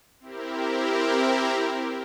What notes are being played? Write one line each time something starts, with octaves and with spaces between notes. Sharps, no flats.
C4 E4 G4 A#4